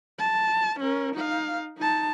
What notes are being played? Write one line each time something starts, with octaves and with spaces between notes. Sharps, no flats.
A5
C#4 A#4
D#4 F5
D#4 A5